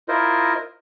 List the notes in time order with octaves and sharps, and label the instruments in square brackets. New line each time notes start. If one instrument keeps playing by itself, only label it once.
[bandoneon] E4 F4 A#4 C5 D#5